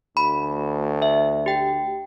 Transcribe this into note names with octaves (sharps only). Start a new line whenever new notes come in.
D2 B5
E5
G4 G5